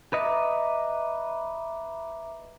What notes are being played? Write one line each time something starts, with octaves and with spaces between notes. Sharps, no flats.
B4 D#5 E5 A#5 D6